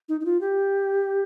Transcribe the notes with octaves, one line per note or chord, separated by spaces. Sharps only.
D#4
D#4
F4
G4